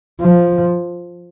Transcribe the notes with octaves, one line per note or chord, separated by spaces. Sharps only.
F3